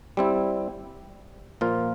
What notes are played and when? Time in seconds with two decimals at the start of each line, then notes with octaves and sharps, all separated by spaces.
0.17 G3 C4 E4
1.61 A#2 F3 A#3 F4